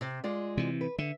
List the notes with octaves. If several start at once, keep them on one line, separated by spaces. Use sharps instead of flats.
C3
G#3 F4 D5
C3 E3
B4
D3 E5